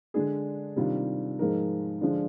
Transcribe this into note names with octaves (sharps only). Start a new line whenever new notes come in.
D3 G#3 D4 G#4
C3 D#3 G3 D4 F4
G#2 F3 G#3 D#4 A#4
D3 F3 G#3 D4